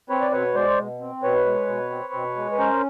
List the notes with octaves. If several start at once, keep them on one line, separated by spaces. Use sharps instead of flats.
C4 B4 C#5
D5
B2 B4 C#5
G#3 C5 D5
B2
C4
B2 B4 C#5
G#3
B2
C4
B2
G#3
B4
C#4 A#4 C5